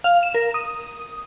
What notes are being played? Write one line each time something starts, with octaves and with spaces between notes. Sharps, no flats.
F5
E7
A#4
D#6